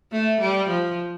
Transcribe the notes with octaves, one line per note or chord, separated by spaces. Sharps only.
A3
G3
F3